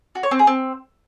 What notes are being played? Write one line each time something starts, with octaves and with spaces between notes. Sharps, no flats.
F#4
C#5
C4
G#4
C4